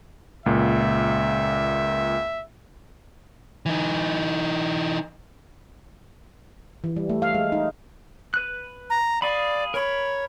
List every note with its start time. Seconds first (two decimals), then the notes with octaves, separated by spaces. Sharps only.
0.46 C#2 A#2 E5
3.66 E3 D#4
6.84 E3
6.96 G3
7.10 A3
7.22 F5
7.35 G#3
7.52 D#4
8.34 B4 F#6
8.90 A#5
9.22 G#4 D5 F5 B5
9.74 A#4 C#5 B5